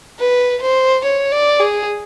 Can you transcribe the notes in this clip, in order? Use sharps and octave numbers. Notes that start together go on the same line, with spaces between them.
B4
C5
C#5
D5
G#4